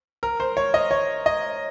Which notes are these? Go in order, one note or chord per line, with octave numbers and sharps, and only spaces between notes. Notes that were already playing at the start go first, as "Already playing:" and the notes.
A#4
C5
C#5
D#5
C#5
D#5